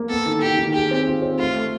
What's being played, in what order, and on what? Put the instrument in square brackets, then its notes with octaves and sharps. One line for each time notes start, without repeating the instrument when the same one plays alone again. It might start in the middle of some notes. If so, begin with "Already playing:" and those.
Already playing: [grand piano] A#3
[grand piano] B3 [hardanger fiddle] A4
[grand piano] D#3
[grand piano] D#3 [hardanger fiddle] G4
[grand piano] D#3
[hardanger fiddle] G4 [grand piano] G#4
[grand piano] C4
F4
C4
[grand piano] A3 [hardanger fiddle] F4
[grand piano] A3